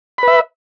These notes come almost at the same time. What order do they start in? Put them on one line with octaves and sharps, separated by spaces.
B5 B4 E5